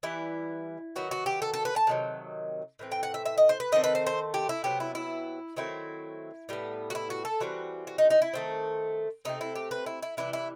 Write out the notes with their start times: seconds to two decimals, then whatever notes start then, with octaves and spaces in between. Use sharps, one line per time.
0.03 E3 G3 B3 E4
0.96 D#3 F#3 B3 F#4
1.11 F#4
1.26 G4
1.42 A4
1.54 A4
1.65 B4
1.76 A5
1.87 C3 D#3 F#3
2.79 A2 E3 C4
2.92 G5
3.03 F#5
3.14 E5
3.26 E5
3.38 D#5
3.49 C5
3.60 B4
3.72 D#3 A3 C4 D#5
3.84 B4
3.95 C5
4.06 C5
4.34 G4
4.49 E4
4.64 C3 F#3 B3 G4
4.80 E4
4.95 E4
5.56 D#3 F#3 A3 C4 E4
6.49 A2 G3 B3
6.90 F#4
6.95 E4
7.10 F#4
7.25 A4
7.40 E3 G3 C4 F#4
7.87 F#4
7.98 D#4
8.10 D#4
8.22 E4
8.34 D#3 A3 C4
9.25 C3 D#3 A3 C4 D#4
9.41 E4
9.55 G4
9.71 B4
9.86 E4
10.02 E4
10.17 C3 E3 G3 E4
10.33 E4